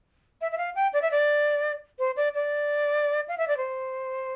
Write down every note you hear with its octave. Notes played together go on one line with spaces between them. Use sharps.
E5
E5
F5
G5
D5
E5
D5
C5
D5
D5
F5
E5
D5
C5